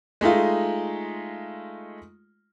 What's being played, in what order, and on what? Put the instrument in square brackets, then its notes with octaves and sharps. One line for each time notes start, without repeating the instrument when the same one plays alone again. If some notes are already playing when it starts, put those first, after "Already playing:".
[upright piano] G#3 A3 D#4 F4